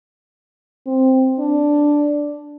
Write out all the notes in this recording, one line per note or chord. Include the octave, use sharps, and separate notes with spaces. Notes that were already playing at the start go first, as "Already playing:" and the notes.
C4
D4